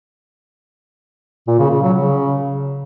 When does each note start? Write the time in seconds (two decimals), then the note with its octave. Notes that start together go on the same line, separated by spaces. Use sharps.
1.47 A#2
1.59 C#3
1.71 C#3
1.82 F#3
1.94 C#3